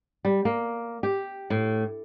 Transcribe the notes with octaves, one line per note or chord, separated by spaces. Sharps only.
G3
A#3
G4
A2